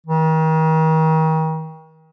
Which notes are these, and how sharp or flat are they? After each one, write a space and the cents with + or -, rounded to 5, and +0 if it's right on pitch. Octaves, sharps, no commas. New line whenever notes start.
D#3 +35